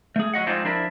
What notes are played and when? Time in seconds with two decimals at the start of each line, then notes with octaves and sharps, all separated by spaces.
0.16 A3 G#4
0.34 F#3 F#4 D#5 F#5
0.47 F3 G#3 C4 D4 D#4 F4
0.64 F3 D4 E4 A#4 D5 E5